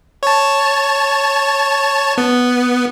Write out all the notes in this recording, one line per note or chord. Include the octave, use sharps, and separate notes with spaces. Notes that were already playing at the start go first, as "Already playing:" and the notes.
C#5 A5
B3